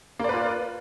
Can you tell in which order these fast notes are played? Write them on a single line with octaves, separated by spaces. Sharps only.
A#3 D5 B4 F4